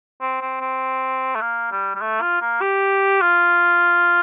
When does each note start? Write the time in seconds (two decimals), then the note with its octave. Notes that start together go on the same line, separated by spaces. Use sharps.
0.21 C4
0.41 C4
0.61 C4
1.35 A3
1.41 A#3
1.71 G3
1.95 G3
2.01 A3
2.21 F4
2.42 A#3
2.61 G4
3.21 F4